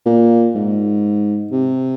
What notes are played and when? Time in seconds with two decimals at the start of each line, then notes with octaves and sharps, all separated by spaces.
0.06 A#2
0.55 G#2
1.52 C3